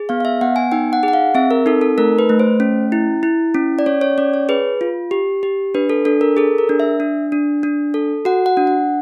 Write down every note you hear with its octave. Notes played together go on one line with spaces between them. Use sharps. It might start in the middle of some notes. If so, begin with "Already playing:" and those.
Already playing: G#4
B3 F5
F5
E5
B3 F#5
G#5
D#4 G5
F#5
G#4
F#5
F5
C4 E5
A#4
D#4 A4
A4
A3 A#4
B4
A3
C5
C#4
E4
E4
C#4
D5
C#4 C#5
C#5
C#4 D5
C#5
G#4 B4
F4
G4
G4
D4 B4
A4
D4 A4
A#4
G#4 A4
A#4
D4
E5
D4
D4
D4
A4
F#4 F#5
F#5
D4
F#5